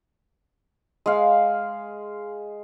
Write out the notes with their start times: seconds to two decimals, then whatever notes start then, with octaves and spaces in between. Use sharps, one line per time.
1.06 G#3 F5